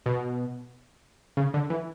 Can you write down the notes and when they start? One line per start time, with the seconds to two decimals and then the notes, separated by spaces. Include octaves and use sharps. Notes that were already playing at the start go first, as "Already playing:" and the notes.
0.06 B2
1.37 C#3
1.54 D3
1.70 E3